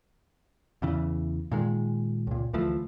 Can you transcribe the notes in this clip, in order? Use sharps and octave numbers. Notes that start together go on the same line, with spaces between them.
E2 C#3 E3
A#2 D#3 G#3
C#2 A#2
D2 E3 F3 A3